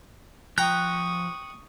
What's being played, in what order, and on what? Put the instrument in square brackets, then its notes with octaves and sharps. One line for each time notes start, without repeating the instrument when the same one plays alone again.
[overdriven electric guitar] F3 [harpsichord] G5 A#5 [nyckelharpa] C#6 D#6 [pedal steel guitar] F#6